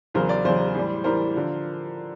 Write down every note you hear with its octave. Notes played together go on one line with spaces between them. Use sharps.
E2 C#3 F#3 A#4 C5
C5 D5
E2 C#3 F#3 C5 D5
A2 E3 G3
A2 E3 G3 A#4 C5
D3 F3